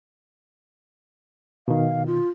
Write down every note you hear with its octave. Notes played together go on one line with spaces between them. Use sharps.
B2 D#3 F5
F4